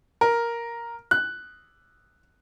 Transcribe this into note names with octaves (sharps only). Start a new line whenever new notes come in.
A#4
F#6